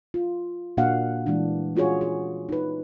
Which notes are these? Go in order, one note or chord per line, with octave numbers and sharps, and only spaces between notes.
F4
A#2 A#3 D4 F#4 F5 F#5
E3 G3 G#3 D4
C#4 F4 F#4 G#4 C#5
G#4
D#4 B4